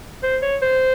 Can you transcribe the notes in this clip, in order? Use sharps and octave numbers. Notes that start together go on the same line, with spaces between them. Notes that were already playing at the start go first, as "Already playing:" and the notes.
C5
C#5
C5